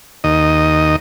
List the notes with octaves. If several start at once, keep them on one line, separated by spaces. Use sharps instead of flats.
D#2 D#5